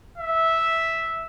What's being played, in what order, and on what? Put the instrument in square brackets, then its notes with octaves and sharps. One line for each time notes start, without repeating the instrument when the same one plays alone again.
[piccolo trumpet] E5